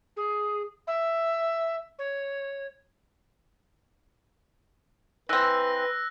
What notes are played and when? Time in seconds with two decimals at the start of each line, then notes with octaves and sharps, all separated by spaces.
0.17 G#4
0.87 E5
1.99 C#5
5.29 E3 C4 B4 E6 F#6 A#6